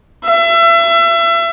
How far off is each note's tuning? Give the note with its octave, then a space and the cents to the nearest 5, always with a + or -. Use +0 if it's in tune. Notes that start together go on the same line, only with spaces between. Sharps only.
E5 +35